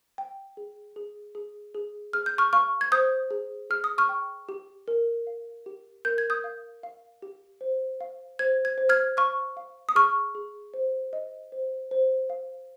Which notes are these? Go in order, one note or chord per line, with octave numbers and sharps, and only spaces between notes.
G5
G#4
G#4
G#4
G#4
G#4 F6
G6
C#6 F6
F5 C#6 F6
G#6
C5 D#6 G6
G#4
G#4 F6
D#6
C#6 F6
G5
G4
A#4
F5
G4
A#4 G6
G#6
D#6 G6
F5
F5
G4
C5
F5
C5 G#6
G#6
C5
F6 G#6
F5 C#6 F6
F5
D#6
G#4 C#6 F6
G#4
C5
D#5
C5
C5
F5